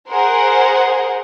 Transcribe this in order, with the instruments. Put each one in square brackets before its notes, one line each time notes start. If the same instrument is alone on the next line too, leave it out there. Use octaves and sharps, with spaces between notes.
[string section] G#4 A#4 C5 F#5